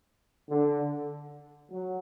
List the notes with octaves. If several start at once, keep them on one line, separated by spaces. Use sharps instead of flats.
D3
F#3